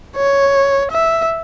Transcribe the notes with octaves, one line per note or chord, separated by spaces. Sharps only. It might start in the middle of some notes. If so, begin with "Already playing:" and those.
C#5
E5